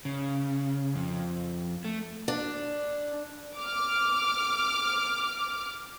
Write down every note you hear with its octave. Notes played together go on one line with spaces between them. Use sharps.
C#3
F2
A3
D4
D6 F6